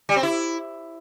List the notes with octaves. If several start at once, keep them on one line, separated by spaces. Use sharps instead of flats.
G3
C4
E4